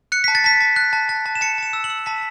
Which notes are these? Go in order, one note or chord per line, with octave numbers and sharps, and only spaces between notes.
F#6 C#7
A5 B6
A6
A5 B6
A5
F#6
A5
A5
A5
E7
A5 C#7
A5 E7
E6
F#7
E6
A5 B6